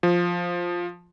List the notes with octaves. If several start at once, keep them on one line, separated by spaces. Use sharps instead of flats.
F3